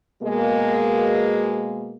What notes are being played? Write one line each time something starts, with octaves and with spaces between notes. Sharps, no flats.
B2 G#3 A#3